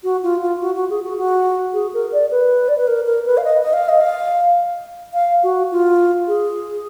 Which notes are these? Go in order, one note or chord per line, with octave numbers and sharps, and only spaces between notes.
F#4
F4
F4
F#4
F#4
G#4
F#4
F#4
G#4
A#4
D5
B4
D5
B4
A#4
A#4
B4
F5
D#5
D#5
F5
D#5
F5
F5
F#4
F4
G#4